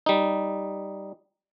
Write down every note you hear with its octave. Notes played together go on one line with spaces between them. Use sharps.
G3 D#4